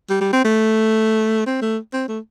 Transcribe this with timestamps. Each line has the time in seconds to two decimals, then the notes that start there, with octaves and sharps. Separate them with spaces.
0.10 G3
0.21 G3
0.33 C4
0.44 A3
1.47 C4
1.62 A3
1.93 C4
2.08 A3